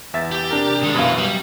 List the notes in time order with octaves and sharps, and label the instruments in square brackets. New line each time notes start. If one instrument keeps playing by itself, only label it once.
[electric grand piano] E2 E5 A6
[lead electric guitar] G4
[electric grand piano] C3 D4 A#4
[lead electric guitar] D#3 G#3
[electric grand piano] F#2 B2 F5 [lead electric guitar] E4 B4
[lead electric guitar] G3